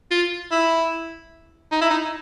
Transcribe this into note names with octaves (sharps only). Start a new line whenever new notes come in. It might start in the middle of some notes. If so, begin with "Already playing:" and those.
F4
E4
D#4
E4
D#4